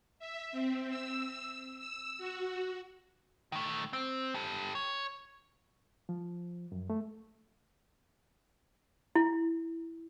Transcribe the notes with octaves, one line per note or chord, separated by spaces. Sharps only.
E5
C4
E6
E6
F#4
D#3 A3
C4
G4 A4
C#5
F3
F#2
A3
E4